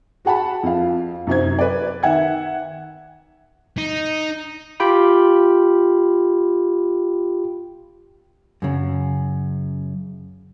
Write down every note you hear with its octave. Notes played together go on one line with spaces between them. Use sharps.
F#4 G#4 F#5 A5 B5
F2 F5
F#2 C3 D#4 C5 G#6
B4 D5
D#3 E5 F#5 G#6
D#4
F4 G4 G5 B5
F#2 C#3